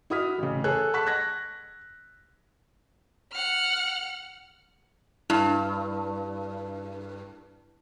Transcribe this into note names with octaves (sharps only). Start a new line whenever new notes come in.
E4 F#4 D#6 F6 B6
A1 C#3
G#4 A4 C#5 F#6
F#5 A5 C#6 F#6 B6
F#6 G#6 A#6
F#5 F6
G2 E4